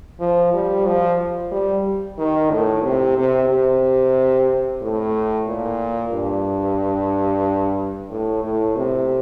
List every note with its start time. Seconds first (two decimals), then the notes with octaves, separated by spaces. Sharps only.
0.20 F3
0.54 G3
0.86 F3
1.52 G3
2.18 D#3
2.51 A2
2.84 C3
3.17 C3
3.49 C3
4.81 A2
5.47 A#2
6.12 G2
8.10 A2
8.43 A2
8.76 C3